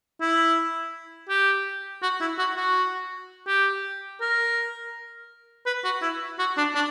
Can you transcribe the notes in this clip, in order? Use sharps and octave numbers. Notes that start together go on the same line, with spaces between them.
E4
G4
F#4
E4
F#4
F#4
G4
A#4
B4
F#4
E4
F#4
D4
D4